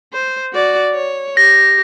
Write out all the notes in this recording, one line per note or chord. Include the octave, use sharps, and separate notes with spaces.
C5
F#4 D5
C#5
G4 A#6